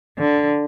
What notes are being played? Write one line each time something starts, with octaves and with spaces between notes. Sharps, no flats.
D3